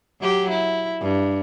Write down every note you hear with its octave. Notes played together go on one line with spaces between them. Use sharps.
F#3 G4
E4
G2